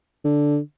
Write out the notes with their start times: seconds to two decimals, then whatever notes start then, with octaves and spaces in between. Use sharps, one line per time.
0.25 D3